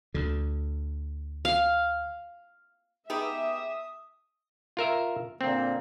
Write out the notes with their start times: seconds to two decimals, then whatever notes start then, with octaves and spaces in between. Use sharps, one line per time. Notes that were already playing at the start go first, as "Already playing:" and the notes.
0.14 D2 D3
1.45 F5
3.10 B3 D#4 G4 G#4 E5 B5 D6 D#6
4.77 F4 A#4 E5
5.41 A#2 D3 A#3 C4